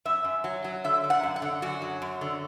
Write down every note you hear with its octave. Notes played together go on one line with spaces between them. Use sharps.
F#2 E5
F#2
F#3
F#3
D3 E5
D3
F#5
F#2
F#5
D3
F#2 F#4
F#3
F#2
D3